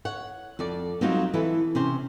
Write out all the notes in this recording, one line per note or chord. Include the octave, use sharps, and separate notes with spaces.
C#5 F#5
F2 A4 D5
F#3 G3 C4 D#4 F4 F#4
E3 E4 A4
C3 C#4 C5